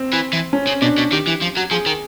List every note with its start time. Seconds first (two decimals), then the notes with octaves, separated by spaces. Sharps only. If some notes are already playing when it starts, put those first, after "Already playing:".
Already playing: C4
0.13 E3
0.33 E3
0.53 C#4
0.67 C#3
0.82 B2 D4
0.97 B2
1.12 D#3 G4
1.27 E3
1.42 F3
1.57 F#3
1.71 F3 G#4
1.86 D#3